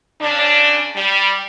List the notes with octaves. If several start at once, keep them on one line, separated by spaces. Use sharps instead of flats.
C#3 D4
G3